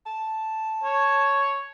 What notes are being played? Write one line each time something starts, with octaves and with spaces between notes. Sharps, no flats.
A5
C#5